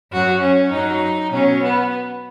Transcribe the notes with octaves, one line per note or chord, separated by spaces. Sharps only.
F#2 F#3 F#4
C#4
F#2 F#3 D#4
B2 F#3 C#4
B3